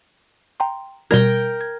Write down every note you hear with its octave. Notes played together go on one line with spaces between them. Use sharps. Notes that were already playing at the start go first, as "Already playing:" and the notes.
G5 A#5 C6
B2 G3 A#4 G5 G#6
G#6